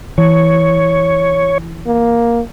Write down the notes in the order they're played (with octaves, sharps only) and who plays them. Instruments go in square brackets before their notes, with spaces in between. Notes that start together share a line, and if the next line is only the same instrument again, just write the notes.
[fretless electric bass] E3 [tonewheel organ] C#5
[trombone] A#3